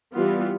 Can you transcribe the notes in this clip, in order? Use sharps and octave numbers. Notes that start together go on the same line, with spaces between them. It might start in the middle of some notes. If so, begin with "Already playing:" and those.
E3 G3 B3 F4